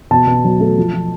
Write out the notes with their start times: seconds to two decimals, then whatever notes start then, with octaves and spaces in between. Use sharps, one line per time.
0.11 B2 A5
0.27 B2
0.44 F#3
0.60 A3
0.78 F3
0.93 F3